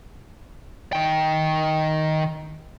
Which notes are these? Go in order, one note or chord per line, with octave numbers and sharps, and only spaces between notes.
D#3 G5